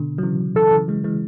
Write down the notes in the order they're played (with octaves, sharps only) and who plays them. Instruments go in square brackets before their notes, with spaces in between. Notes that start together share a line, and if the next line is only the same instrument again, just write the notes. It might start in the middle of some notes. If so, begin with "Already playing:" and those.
Already playing: [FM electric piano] B2 D3
F#3
C#3 E3
[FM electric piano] C#3 E3 [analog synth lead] A4
[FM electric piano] C#3 E3
E3 G#3
E3 G#3